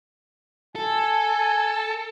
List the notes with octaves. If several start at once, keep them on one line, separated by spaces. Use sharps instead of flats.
A4 G#5